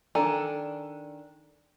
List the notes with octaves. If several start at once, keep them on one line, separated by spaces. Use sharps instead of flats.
D#3 D4 A4 G#5 A#5